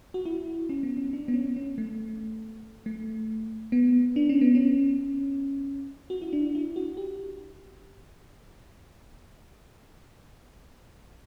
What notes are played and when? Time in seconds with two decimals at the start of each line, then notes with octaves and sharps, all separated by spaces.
0.14 F#4
0.25 E4
0.69 C#4
0.83 B3
0.97 C#4
1.13 D4
1.28 B3
1.34 C#4
1.56 C#4
1.78 A3
2.86 A3
3.72 B3
4.16 D4
4.29 C#4
4.41 B3
4.55 C#4
6.10 F#4
6.22 E4
6.33 D4
6.55 E4
6.76 F#4
6.97 G4